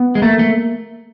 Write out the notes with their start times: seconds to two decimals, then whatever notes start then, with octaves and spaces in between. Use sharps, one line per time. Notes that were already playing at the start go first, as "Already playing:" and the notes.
Already playing: B3
0.15 G#3
0.22 A3 A#3
0.39 A3